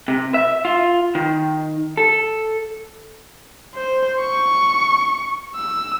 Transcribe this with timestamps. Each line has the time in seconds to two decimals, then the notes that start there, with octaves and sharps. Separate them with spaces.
0.08 C3
0.34 E5
0.65 F4
1.15 D#3
1.97 A4
3.75 C5
4.21 C#6
5.56 E6